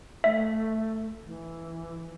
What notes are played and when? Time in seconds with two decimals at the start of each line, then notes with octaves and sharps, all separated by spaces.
0.24 A3 E5
1.26 E3